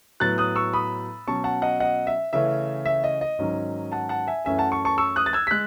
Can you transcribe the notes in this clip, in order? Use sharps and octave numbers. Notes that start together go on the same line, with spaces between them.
A2 F#3 B3 F#6 A6
D#6 F#6
C#6 E6
B5 D#6
B2 F#3 C#4 A5 C#6
F#5 A5
D#5 F#5
D#5 F#5
E5
C#3 E3 A3 C#4 E5
E5
D#5
D#5
G#2 D#3 F#3 C#4
F#5 A5
F#5 A5
E5 G#5
F#2 E3 A3 C#4 E5 G#5
F#5 A5
A5 C#6
A5 C#6
C#6 E6
D#6 F#6
A6
E6 G#6
B6
G#3 F#6